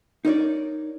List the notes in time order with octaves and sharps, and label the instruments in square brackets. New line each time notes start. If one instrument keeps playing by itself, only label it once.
[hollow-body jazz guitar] D#4 A#4 C#5 D5